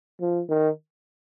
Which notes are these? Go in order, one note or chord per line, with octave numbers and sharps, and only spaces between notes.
F3
D#3